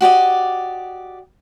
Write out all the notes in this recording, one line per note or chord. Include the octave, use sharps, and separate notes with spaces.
F#4 G4 D5 D#5